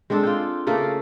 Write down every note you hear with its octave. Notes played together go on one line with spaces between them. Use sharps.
G#3 C4 D4 A4
F4 G5
C#3 A3 A#3 A4